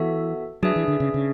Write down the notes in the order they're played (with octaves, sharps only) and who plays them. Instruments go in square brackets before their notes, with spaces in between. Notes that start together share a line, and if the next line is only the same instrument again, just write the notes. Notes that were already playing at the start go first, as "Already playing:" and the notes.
Already playing: [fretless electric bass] E3 [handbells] B3 F#4 A4 E5
[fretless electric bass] F#3 [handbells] D4 G#4 B4 E5
[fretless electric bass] E3
D3
C#3
C#3